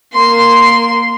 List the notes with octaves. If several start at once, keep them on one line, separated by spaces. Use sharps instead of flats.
A#3 C6